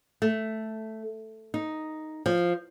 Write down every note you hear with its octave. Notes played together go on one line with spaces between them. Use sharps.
A3
D#4
F3